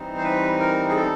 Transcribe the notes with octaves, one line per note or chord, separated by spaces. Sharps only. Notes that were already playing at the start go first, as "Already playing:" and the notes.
Already playing: E3 G3 C4 D#4
C5
B4
A#4
G#4
A4